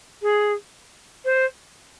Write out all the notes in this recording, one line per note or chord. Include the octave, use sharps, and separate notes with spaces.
G#4
C5